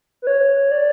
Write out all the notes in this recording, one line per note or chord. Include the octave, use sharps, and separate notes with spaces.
B4
C#5
D5